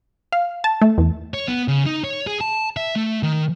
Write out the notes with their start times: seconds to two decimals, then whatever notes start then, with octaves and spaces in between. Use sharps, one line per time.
0.32 F5
0.64 A5
0.82 A3
0.98 E2
1.34 C#5
1.48 B3
1.68 C#3
1.86 D#4
2.04 C#5
2.27 G#4
2.41 A5
2.77 E5
2.96 A3
3.23 D#3